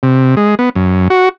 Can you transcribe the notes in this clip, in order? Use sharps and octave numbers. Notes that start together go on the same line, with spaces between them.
C3
G#3
B3
F#2
F#4